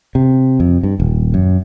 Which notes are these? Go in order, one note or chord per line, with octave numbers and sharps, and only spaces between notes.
C3
F2
G2
D#1
F#2